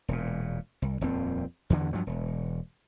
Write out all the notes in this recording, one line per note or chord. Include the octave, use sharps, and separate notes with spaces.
E1 A#2
C2
D#1 F2 C4
E2 G2 D3 E3
G2 F3 F#3
E1